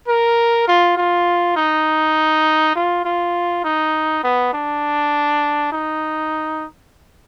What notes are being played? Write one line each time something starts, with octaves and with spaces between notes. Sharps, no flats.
A#4
F4
F4
D#4
F4
F4
D#4
B3
D4
D#4